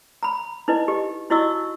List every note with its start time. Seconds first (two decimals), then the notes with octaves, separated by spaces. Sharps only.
0.23 A#5 B5
0.68 D#4 E4 B4 D#5
0.88 G4 D#5
1.30 D#4 E4 F#4 D#5 C#6 E6